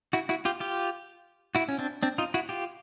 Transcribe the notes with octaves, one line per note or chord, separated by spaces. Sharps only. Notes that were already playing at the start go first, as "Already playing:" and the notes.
E4 F#4
E4 F#4
F4 G4
F4 G4
E4 F#4
C#4
C4 D4
C4 D4
D#4 F4
E4 F#4
F4 G4